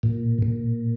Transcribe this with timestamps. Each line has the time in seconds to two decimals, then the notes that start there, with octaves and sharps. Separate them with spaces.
0.03 A#2
0.42 A#2